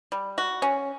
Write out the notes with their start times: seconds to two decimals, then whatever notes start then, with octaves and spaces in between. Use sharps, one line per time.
0.12 G3
0.38 F#4
0.62 C#4